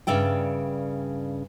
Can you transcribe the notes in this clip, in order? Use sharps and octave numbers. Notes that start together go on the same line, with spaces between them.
G2 C#3 D5 E5 G5